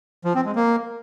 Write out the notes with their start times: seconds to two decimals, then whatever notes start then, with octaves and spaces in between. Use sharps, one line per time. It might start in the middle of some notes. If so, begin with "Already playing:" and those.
0.25 F3
0.35 C4
0.45 G#3
0.55 A#3